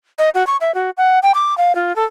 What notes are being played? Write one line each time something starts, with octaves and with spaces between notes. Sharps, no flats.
D#5
F#4
C#6
E5
F#4
F#5
G5
D6
F5
F4
A4